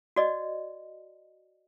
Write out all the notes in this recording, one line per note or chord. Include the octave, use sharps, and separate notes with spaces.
F#4 D5 D#5